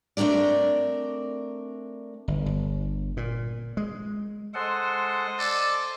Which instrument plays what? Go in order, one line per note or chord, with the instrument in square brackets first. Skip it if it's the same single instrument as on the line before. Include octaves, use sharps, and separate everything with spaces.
[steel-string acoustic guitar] A3 C4 D4 A#4 D5
[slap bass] G1
G1
A#2
G#3
[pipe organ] G#3 A4 F#5 [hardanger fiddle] C5 D#5
[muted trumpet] A4 [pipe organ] D5